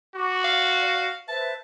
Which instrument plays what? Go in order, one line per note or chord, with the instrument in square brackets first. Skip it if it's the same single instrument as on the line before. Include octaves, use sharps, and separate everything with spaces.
[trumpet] F#4 [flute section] C#6 D6
[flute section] D5 [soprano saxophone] F5
[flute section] B4 C5 E5 [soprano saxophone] A5